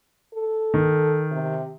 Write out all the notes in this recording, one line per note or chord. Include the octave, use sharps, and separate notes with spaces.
A4
D#3
C3